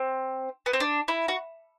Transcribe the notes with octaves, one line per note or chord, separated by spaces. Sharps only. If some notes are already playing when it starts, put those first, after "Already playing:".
Already playing: C4
B3
C4
D4
E4
F#4